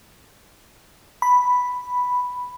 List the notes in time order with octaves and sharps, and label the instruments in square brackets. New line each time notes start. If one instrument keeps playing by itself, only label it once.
[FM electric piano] B5